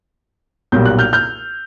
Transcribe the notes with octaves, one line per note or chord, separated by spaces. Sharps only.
B1 A#2 G3 G6
F#6
F6 G6
F6 G6